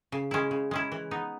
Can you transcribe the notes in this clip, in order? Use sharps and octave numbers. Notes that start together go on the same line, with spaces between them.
C#3
G#3 C#4 E4
C#3
G#3 C#4 E4
E3
B3 D#4